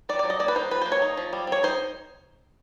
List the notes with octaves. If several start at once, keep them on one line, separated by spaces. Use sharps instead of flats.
D#3 D5
D5
F#3
D#5
A#3 D5
B4
D#4 C5
F3 B4
A#3 C5
C#5
D#4
F3
G3
C4 C#5
D#4 C5